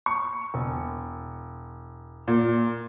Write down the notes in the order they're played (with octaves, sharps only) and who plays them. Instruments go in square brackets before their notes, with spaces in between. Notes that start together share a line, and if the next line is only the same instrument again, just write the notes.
[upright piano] C#6
E1
A#2